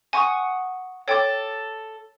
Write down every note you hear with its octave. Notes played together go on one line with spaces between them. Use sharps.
F#5 G#5 C#6 D#6
A4 C#5 G5 D6